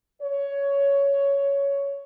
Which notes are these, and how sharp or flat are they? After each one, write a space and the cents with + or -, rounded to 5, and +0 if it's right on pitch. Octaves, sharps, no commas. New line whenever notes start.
C#5 +10